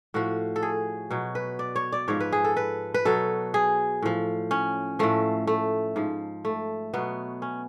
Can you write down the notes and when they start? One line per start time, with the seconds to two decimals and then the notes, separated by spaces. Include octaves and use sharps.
0.14 A2 F3 F#4
0.56 A4
0.62 G#4
1.11 B2 F#3
1.35 B4
1.59 D5
1.76 C#5
1.92 D5
2.08 G#2 F3 C#5
2.20 B4
2.32 G#4
2.44 A4
2.57 B4
2.94 B4
3.05 B2 F#3 A4
3.54 G#4
4.02 A2 F3
4.51 C#4
4.99 A2 F3 A3
5.47 A3
5.96 G#2 F3
6.45 A3
6.94 B2 F#3 B3
7.42 C#4